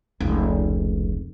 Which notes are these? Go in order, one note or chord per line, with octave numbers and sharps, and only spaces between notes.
F1 C#2